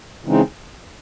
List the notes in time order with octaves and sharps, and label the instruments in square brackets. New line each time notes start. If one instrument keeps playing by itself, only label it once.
[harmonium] C#3 E3 G#3 C4 D#4